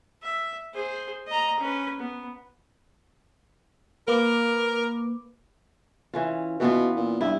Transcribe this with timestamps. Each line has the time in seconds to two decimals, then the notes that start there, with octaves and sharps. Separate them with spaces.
0.22 E5
0.73 G#4 C5
1.27 D#5 A#5
1.59 C#4 B4
1.99 B3
4.08 A#3 A#4 B4 D6
6.14 E3 C#4 F4
6.60 B2 E3 B3 F4
6.97 A#2
7.21 G2 E4